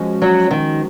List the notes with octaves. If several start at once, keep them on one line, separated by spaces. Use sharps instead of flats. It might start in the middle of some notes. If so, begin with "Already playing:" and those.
Already playing: F3 G#3 C#4 F#4
F#3
D#3